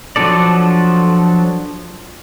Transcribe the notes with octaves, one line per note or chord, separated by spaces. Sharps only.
F3 F#3 D4 A4 D5